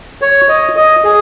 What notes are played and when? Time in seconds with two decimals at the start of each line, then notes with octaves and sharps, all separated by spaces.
0.22 C#5
0.49 D#5
0.76 D#5
1.05 G#4